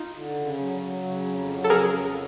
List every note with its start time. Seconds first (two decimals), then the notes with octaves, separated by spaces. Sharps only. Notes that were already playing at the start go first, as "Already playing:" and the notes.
Already playing: D#4 F4
0.13 D3
0.35 C#3
0.58 F#3
0.81 F#3
1.03 C#3
1.25 F2
1.47 F#3
1.64 A4
1.70 C#3 G#4 A#4
1.93 F2